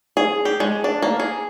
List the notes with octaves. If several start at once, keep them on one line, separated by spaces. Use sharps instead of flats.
G#4
G4
G#3
D4
A#3
G#4